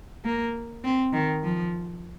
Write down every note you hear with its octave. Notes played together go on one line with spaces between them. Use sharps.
A#3
C4
D#3
F3